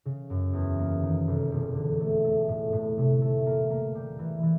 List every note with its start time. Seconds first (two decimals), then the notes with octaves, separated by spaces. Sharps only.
0.05 C#3
0.30 F#2
0.53 E2
0.79 A#3
1.02 D#3
1.27 F1
1.52 E1
1.75 D3
2.00 A3
2.24 A3
2.48 A2
2.73 A2
2.98 C3
3.22 A3
3.46 A#3
3.70 A#3
3.95 G3
4.19 E3
4.43 E3